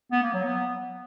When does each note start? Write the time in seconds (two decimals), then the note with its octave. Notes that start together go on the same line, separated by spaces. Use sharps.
0.12 B3
0.23 A#3
0.34 F#3
0.44 B3